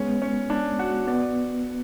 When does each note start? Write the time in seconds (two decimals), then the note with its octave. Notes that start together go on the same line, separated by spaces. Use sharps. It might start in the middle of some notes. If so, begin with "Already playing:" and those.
Already playing: G#3 B3 C#4
0.22 C#4
0.50 D4
0.79 F#4
1.07 B3 D5